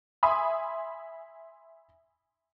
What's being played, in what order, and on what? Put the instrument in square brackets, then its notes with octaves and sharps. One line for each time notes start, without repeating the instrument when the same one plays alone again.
[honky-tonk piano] E5 G#5 B5 C6 D#6